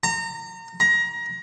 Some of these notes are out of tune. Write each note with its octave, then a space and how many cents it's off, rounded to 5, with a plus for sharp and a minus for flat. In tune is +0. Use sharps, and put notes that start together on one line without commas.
A#5 -30
A#5 +25